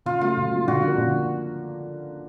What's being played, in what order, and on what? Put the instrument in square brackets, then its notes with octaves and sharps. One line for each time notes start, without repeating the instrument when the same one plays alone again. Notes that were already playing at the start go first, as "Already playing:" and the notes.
[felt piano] C#3 [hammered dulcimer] F4
[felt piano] F#3 A3 [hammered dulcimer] F4
[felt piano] C#3
F#3 A3
[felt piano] D3 [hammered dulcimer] F#4
[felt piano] F3 A#3
D3